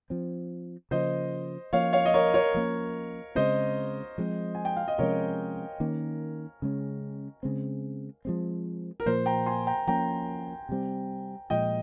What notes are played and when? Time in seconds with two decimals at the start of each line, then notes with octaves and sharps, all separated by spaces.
0.10 F3 C4
0.91 C#3 F3 A#3 C5 D#5
1.73 F3 A#3 C#4 C#5 F5
1.93 C#5 F5
2.06 D#5
2.14 A#4 C#5
2.34 A#4 C#5
2.54 F3 A#3 C#4
3.35 C#3 G#3 C4 C5 D#5
4.18 F3 G#3 C4
4.55 G#5
4.65 G5
4.77 F5
4.88 D#5
4.98 C3 F3 G#3 C#4 A#4 C#5
5.80 D#3 A#3 C#4
6.62 C#3 G#3 C#4
7.43 C#3 G#3 C4
8.25 F3 G#3 C4
9.00 A#4
9.06 A#2 F3 A#3 C5
9.26 G5 A#5
9.46 G#5 C6
9.67 G5 A#5
9.87 F3 A#3 C#4 G5 A#5
10.69 C3 G3 C4
11.50 A#2 F3 G#3 D#5 G5